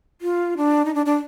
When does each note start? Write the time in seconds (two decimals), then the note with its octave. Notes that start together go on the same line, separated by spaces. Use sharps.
0.21 F4
0.57 D4
0.85 D#4
0.95 D4
1.06 D4